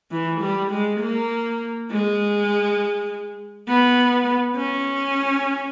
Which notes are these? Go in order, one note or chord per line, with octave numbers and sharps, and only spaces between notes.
E3
G3
G#3
A#3
G#3
B3
C#4